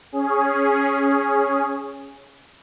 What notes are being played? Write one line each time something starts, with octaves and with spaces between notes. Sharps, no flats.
C#4 G#4